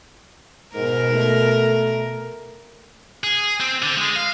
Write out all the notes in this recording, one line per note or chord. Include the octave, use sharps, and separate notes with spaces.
G#2 B2 A#4
A3
G#4
C4
D3
G#3
F5